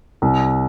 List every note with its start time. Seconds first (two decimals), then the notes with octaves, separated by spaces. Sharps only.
0.22 C2